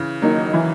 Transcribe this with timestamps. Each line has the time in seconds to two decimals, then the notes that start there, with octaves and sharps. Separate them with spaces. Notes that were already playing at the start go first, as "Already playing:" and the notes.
Already playing: C#3 E3
0.22 D#3 F#3 A#3 D#4
0.54 E3